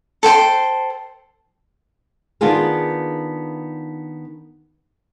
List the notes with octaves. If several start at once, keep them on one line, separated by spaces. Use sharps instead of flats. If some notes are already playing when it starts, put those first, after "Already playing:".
A4 C5 G5 C6
D#3 B3 D4 F4 G#4 A#4